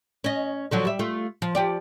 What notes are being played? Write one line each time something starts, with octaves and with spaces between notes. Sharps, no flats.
C#4 D#5
D3 F3 F#3
G3 E5
A3 F4
F3
F3 G4 D5